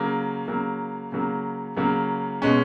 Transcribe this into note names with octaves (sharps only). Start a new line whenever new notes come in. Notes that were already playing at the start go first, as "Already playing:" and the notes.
Already playing: C#3 F#3 A#3
C#3 F#3 A#3
C#3 F#3 A#3
C#3 F#3 A#3
B2 G#3 C#4